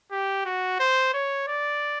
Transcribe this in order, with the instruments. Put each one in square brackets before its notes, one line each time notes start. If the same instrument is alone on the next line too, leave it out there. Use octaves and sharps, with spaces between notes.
[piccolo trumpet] G4
F#4
C5
C#5
D5